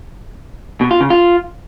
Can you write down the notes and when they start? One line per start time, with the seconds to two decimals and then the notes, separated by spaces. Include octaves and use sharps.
0.81 B2
0.91 F4
1.01 C#3
1.10 F4